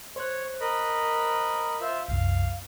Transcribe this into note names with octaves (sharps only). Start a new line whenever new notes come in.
C5 C#5 F#6
A#4 D#5 B5
F4 C5 E5
C2 F#2 F5